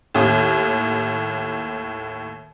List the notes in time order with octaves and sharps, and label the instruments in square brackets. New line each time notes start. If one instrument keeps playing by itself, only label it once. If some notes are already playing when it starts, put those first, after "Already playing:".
[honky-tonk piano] D#2 A2